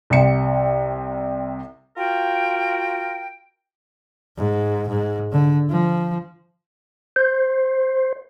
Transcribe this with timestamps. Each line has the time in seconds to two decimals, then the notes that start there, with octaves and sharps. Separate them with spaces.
0.10 C2 C3 C#7
1.97 F4 F#4 A#4 G5
4.37 G#2
4.89 G#2
5.32 D3
5.70 F3
7.16 C5